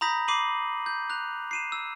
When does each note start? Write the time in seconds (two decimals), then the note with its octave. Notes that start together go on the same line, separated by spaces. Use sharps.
0.01 A#5 B5 D#6 G6 A#6 B6
0.28 B5 D6 C7 D#7 F#7
0.86 G6
1.10 F#6 F7
1.51 C7 D#7 E7
1.72 E6